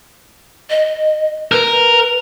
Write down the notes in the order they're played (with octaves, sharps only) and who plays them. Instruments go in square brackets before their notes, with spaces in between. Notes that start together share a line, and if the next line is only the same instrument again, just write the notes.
[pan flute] D#5
[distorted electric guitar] A#4 [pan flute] B4